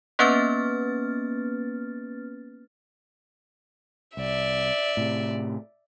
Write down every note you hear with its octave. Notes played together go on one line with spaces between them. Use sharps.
A#3 B3 C#4 B4 F6 A6
C2 D5 E5
A2 C3